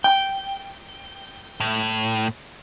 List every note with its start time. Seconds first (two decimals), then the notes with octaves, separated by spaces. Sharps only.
0.04 G5
1.60 A2